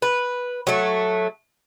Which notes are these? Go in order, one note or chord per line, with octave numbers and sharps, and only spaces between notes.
B4
F#3 A3